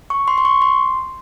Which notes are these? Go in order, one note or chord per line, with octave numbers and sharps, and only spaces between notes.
C#6
C6
C6
C#6
C6